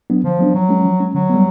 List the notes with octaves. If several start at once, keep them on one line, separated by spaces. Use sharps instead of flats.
F#3 B3 D4
D3 F3
F#3 B3 D4
F3 F#3
G#3 C#4
F3
G#3 C#4
D3 F#3
G3 B3